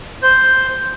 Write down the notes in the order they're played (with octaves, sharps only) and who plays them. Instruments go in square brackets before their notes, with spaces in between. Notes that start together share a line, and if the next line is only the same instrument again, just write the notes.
[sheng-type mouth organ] C5 G6